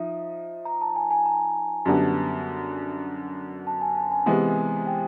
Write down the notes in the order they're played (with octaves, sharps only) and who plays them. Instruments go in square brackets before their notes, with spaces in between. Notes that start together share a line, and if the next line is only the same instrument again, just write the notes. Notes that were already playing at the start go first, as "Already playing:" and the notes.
Already playing: [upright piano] F3 D#4 [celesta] E5
[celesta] A#5
A5
G#5
G#5
A#5
[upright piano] F#2 D3 G3 B3 [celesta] A5
[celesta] A5
G#5
A5
G#5
[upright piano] C3 E3 G#3 B3
[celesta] G5